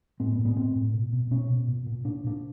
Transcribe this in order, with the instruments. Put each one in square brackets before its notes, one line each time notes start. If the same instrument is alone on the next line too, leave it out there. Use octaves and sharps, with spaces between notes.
[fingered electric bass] A2 C4
B3
A2
B3
A2 C4
A2
B2
B2
B2 C#4
B2
A#2
A#2
A#2 D4
A#2 D4